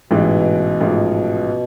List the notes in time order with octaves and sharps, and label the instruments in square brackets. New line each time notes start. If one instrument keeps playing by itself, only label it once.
[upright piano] A1 G#2 E3 [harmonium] B2
[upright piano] A1 G#2 F3